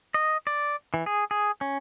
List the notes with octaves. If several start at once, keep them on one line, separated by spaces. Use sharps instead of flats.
D#5
D5
E3
G#4
G#4
C#4